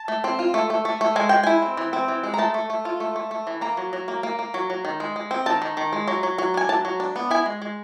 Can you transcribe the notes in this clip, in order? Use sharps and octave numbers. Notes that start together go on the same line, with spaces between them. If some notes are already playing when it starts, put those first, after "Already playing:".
Already playing: A5
A3
C4
F4
A3
A3
A3
A3
G#3 G#5
G#3 G5
E4 G#5
C4
E3
C4
E3
G#3
A#5
A3 A5
A3
A3
F4
A3
A3
A3
E3
A#3 A#5
F#3
F#3
A#3
A#3
A#3
F#3
F#3
D#3
G#3
G#3
C4
D#3 A5
D#3
D#3
G#3
F#3
F#3
F#3
D4 G#5
F#3 A5
F#3
D4
B3
E4 G#5
G#3
G#3